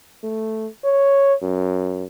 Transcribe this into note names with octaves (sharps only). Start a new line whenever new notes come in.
A3
C#5
F#2